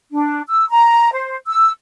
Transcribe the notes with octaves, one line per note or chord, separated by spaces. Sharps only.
D4
E6
A#5
C5
E6